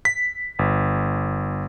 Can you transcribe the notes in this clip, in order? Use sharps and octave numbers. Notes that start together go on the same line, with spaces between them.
B6
G1